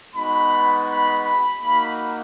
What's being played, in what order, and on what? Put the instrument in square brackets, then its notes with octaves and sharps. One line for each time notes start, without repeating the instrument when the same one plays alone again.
[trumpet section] G#3 B3 D#4 F#4 B5
B5
B5
A#3 D#4 F#4 B5